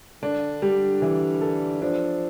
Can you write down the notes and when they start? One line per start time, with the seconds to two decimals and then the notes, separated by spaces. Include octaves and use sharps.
0.23 D3 D4
0.62 G3
1.02 E3
1.41 A4
1.82 F3 D4